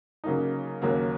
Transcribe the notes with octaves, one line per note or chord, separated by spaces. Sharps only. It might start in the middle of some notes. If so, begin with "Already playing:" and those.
C#3 F#3 A#3 D#4
D#2 C#3 F#3 A#3